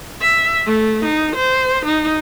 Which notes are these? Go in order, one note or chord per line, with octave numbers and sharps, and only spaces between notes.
E5
A3
D#4
C5
D#4